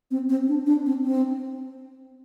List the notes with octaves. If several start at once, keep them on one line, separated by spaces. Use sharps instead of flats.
C4
C4
D4
D4
C4
C4